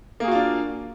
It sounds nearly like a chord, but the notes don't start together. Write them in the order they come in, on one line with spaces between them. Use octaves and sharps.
A#3 G#4 F#4 F4 D4